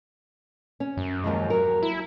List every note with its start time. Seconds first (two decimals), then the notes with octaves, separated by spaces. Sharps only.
0.80 C#4
0.97 F#2
1.24 D#2 F3 G#3
1.50 F#3 A#4
1.83 E4